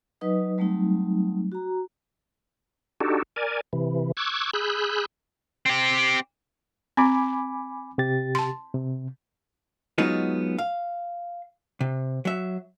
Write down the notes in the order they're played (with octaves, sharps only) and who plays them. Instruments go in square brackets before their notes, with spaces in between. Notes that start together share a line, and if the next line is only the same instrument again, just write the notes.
[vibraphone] F#3 D#4 B4 D#5 D#6
F#3 G3 A3 C4 D#4
F#4 A#5
[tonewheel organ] D4 D#4 F#4 G4 A4
A#4 D5 G#5
C3 E3
C#6 D6 E6 F#6 G#6
G#4 B5 E6 F#6 G6
[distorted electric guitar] C4 G4
[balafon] C4 [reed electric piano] G#5 B5 D6
[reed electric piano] C3 G4 A6
[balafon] A5 C6
[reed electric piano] C3
[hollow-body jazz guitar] F#3 G#3 B3 C#4 D#4 F4
F5
C3
F#3 E5